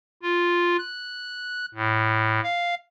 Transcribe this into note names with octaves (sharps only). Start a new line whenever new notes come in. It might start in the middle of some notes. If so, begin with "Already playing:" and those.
F4
F#6
A2
F5